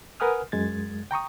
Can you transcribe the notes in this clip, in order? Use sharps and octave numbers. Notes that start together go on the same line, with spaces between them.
A#4 B4 F#5 G#5 D#6 F6
F#2 G#3 G#6 A6
G5 A#5 C#6 D#6